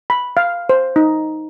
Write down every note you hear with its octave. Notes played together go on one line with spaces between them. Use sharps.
B5
F5
C5
D#4